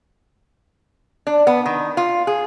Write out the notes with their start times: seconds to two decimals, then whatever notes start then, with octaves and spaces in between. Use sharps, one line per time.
1.27 D4
1.47 B3
1.66 D#3
1.97 F4
2.27 G#4